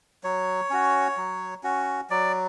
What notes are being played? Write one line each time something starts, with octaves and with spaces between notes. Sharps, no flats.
F#3 C#5
C#4 F#4
F#3
C#4 F#4
F#3 D5